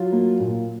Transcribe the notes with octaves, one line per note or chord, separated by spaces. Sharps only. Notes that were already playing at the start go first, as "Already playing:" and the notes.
Already playing: F#3 F4
A#3
A#2